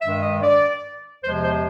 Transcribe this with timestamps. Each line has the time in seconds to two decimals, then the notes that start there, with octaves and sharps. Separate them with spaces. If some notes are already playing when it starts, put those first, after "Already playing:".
0.02 G2 D#3 G#3 E5
0.22 D#5
0.42 D5
1.23 E2 C3 F3 G#3 C5
1.43 C5